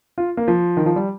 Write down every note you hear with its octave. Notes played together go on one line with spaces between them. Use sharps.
F4
A#3
F3
D#3
F3
G3